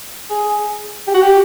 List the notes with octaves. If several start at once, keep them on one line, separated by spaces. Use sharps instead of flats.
G#4
G4
F#4
G4